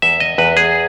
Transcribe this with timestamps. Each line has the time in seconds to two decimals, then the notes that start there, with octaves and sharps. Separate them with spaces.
0.02 E2 E5
0.20 D#5
0.38 E2 B4
0.57 G#4